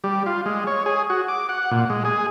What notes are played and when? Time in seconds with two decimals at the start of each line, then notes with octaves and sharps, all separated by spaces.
0.04 G3
0.26 F4
0.46 G#3
0.67 C#5
0.86 G#4
1.10 F#4
1.28 D6
1.49 F#5
1.71 A#2
1.90 G#3
2.05 G#4